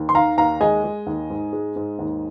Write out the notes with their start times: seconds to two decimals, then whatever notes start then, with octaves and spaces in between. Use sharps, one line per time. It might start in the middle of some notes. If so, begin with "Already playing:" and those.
Already playing: D#2
0.09 C6
0.15 D#3 F5 A#5
0.38 D#2 F5 A#5
0.61 G#3 D#5 G#5
0.84 G#3
1.07 D#2
1.30 G#2
1.53 G#3
1.76 G#2
1.99 D#2